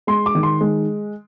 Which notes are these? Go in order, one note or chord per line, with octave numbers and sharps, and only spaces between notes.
G#3 C6
D6
D#3
C6
G#3